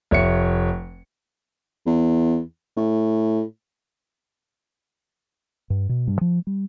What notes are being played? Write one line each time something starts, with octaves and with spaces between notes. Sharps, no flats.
F1 C#5 E5 C#7
E2
A2
G2
B2
G2
F3
G3